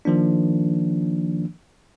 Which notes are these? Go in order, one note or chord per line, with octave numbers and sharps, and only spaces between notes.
D#3 F3 A#3 D4